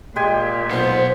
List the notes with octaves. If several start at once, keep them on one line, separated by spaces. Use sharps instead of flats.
A#2 G#3 G4 G#5
B1 B3 C5 C6